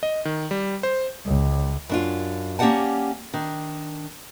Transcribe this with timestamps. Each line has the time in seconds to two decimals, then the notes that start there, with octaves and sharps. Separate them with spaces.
0.03 D#5
0.25 D#3
0.51 G3
0.83 C5
1.26 C#2
1.89 F#2 D4 F4
2.59 A#3 C#4 G4 D5 F#5 A5
3.34 D#3 D4